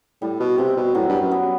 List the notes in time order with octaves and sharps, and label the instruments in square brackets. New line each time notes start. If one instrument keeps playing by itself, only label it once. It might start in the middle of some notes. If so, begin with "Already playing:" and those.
[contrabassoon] A2 [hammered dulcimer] G3
[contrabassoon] B2
[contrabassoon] C3 [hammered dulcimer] C4
[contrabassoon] B2
[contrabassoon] A2 [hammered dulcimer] F#3
[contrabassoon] G2
F#2
[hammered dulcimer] B3